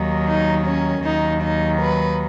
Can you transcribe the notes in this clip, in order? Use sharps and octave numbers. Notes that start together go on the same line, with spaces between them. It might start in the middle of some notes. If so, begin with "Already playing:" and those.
Already playing: D#2 D#3 F#3
D#4
C#4
D#2 D#3 F#3 D#4
D#4
B4